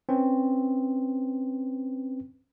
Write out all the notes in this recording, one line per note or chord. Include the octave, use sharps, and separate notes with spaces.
C4 C#4 B4